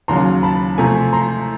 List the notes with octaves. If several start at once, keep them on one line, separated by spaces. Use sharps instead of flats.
D#2 C#3 F#3 A#5 C6
A5 B5
C3 F3 A3 G#5 A#5
A#5 C6